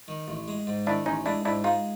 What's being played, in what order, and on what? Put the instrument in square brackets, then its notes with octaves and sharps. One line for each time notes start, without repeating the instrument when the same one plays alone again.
[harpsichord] D#3
A1
G#3
G#2
[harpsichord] D#3 [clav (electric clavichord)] D4 E4
[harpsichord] A1 [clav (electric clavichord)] C#4 D#4
[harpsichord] G#3 [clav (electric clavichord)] D4 E4
[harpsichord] G#2 [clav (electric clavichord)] D4 E4
[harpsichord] G#3 [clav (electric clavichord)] D#4 F4